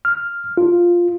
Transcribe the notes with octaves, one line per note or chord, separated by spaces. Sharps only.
F6
F4